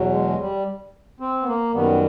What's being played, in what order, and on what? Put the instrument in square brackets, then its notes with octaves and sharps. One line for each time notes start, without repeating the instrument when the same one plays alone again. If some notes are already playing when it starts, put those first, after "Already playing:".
Already playing: [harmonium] E2 B2 F#3
G#3
G3
C4
B3
A#3
F#2 D#3 G3 B3